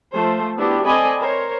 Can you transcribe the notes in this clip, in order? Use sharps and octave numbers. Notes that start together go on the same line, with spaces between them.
F3 A3 C5
B3 D4 E4 F#4 G4
C4 A4 D5 D#5 G#5 B5
A#4 C5 C#5